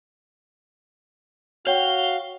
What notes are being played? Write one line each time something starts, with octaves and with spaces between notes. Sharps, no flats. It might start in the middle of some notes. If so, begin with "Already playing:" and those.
F#4 C#5 F5 G5 G7